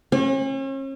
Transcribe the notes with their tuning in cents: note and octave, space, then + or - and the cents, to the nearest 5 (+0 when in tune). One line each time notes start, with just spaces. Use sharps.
C#4 -40